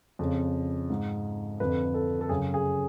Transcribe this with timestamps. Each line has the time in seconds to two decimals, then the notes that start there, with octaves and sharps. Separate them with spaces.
0.19 F2 C#3
0.90 G#2
1.60 F2 D3 B4
1.94 A4
2.21 A4
2.29 F#2 C#3 G#4
2.54 G#4